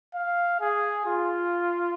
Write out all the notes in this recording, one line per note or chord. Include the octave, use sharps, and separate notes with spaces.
F5
G#4
F4